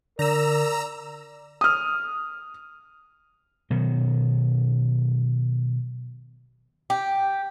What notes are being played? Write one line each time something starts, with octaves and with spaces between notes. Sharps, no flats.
D3 A#4 D5 A#5 E6
D#6 F6
B2 D#3 F#3
G4